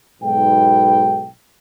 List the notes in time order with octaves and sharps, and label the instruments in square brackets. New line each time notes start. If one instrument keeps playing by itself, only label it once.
[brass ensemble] B1 G#2 B2 G5